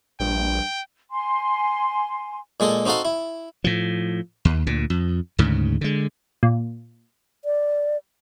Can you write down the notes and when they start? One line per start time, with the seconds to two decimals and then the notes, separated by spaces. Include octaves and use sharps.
0.20 A#1 G2 G5
1.11 G#5 C6
2.60 A#2 G#3 G#4 A4
2.86 C4 D#4 F#4 A4 F5
3.05 E4
3.64 A2 F3
4.45 D#2
4.67 D2 A#2
4.90 F2
5.38 D2 G#2 C#3
5.81 D3 G#3
6.43 A#2
7.45 D5